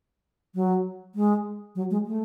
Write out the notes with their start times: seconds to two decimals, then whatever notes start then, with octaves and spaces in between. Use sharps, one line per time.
0.55 F#3
1.15 G#3
1.76 F#3
1.90 G#3
2.06 A3